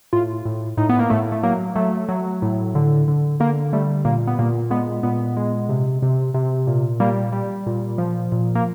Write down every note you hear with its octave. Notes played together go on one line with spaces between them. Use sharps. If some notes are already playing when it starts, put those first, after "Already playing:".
A2 F4
A2
A2 D#4
B3
A#3
A2 A3
A3
F#3 A#3
F#3 A3
F#3
A2
D3
D3
D3 A#3
G3 A3
A#2 A#3
B3
A#2 A#3
G#3 B3
A#2 B3
G#3
C3
C3
C3
A#2
G3 A#3
G3
A#2
F3
A#2
A#3